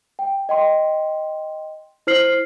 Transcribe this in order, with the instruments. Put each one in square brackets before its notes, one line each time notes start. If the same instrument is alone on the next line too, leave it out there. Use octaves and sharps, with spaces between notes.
[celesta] G5
D#5 G5 C6
E4 C5 F6 C7 F#7